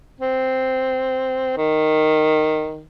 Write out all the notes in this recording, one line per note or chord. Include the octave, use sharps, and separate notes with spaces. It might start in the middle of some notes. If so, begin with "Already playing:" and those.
C4
D#3